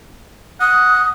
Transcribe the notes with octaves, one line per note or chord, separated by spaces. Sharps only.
F#5 D#6